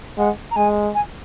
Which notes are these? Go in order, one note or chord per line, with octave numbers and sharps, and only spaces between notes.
G#3 F#5
A#5
G#3 G#5
G#5